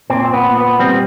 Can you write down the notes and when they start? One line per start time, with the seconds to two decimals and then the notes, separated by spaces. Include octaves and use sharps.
0.10 A#2 C4
0.24 C4
0.34 B3
0.46 A#2
0.57 B3
0.79 G3 C4